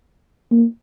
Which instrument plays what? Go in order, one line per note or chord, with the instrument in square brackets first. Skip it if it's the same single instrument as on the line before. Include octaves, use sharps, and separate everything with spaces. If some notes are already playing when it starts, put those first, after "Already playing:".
[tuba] A#3